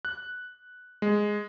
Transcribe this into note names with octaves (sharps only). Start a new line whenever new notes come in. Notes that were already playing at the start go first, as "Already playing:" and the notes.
F#6
G#3